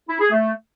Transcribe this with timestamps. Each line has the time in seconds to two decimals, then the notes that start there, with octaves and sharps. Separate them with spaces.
0.09 E4
0.20 G#4
0.31 A3